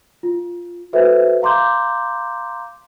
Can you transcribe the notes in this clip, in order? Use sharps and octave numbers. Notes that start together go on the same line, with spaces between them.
F4
F#4 A4 B4 C5 E5
F5 A#5 C6 D6 G6